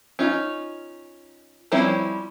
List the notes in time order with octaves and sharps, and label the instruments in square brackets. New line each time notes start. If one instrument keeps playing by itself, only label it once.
[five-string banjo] C#4 D#4 F4
F3 G3 C4 C#4 E4